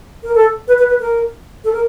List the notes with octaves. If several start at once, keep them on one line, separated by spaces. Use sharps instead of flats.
A#4
A4
B4
B4
B4
A#4
A4
A#4